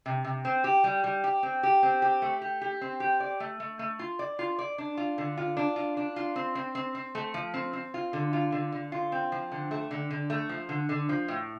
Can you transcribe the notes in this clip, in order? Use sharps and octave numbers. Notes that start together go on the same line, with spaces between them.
C3
C3
C4
G4
G3
G3
G4
C4
G4
C4
G4
A3
G4
G4
C4
G4
D5
A3
A3
A3
F4
D5
F4
D5
D4
F4
D3
F4
D4
F4
D4
F4
C4
C4
C4
C4
A3
F3
C4
C4
F4
D3
F4
D3
D3
F4
C4
F3
D3
A3
D3
D3
A3
F3
D3
D3
F3
A2